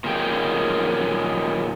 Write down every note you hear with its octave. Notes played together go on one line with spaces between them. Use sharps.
A#2 D#3 F#3 G#3 G5